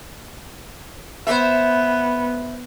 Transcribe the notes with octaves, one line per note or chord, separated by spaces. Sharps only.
B3 C5 E5